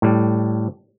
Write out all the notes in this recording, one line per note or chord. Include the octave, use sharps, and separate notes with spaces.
A2 G3